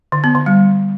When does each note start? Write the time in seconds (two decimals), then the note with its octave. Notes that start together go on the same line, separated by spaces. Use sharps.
0.12 D3
0.24 B3
0.35 D3
0.46 G3